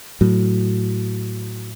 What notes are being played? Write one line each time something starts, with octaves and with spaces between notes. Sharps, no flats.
A2 F#3